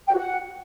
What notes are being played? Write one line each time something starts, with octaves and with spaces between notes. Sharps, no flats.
G5
F#4
F#5